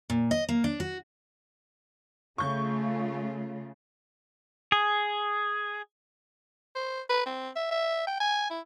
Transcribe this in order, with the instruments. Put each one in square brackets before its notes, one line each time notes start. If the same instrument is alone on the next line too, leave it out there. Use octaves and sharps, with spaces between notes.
[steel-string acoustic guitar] A#2
D#5
A#3
D4
F#4
[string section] C#3 [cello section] A3 F4 [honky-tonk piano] C#6 G6
[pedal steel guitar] G#4
[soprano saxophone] C5
B4
C4
E5
E5
G5
G#5
E4